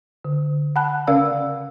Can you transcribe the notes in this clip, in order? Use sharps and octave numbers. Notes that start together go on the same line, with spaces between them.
D3
F#5 G#5 A5 B5 F#6
C#3 C#4 A#4 D5 F5 E6